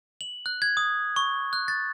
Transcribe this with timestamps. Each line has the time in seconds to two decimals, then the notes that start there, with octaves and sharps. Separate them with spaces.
0.21 F#7
0.46 F#6
0.62 G#6
0.77 D#6
1.16 C#6
1.53 F#6
1.68 A6